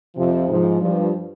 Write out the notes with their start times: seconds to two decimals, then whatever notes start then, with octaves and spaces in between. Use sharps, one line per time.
0.15 F2 C3 F3
0.48 G#2 F3
0.81 G2 F3